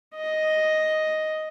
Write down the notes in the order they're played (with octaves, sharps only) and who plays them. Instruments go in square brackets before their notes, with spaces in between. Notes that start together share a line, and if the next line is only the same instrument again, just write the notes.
[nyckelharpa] D#5